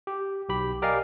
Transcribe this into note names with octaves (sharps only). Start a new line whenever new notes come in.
G4
B1 G4 B5
G4 A#4 D5 D#5 F5 G#5